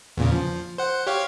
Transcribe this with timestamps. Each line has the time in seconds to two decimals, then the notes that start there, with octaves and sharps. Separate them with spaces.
0.17 E2 A#2 C#3
0.32 F3
0.78 C5 F#5
1.07 G4 C#5 F5